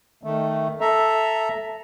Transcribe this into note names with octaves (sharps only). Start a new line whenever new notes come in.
D#3 A3
A4 E5 A#5